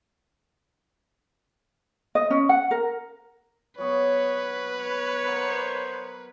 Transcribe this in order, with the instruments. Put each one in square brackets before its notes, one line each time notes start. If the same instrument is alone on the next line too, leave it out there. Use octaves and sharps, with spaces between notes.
[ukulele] D#5
C#4
F#5
A#4
[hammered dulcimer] F#3 B3 F#4 [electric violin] B4 [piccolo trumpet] C#5
[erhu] C#5
[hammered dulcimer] A#4 D#5 F#5 [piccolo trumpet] C5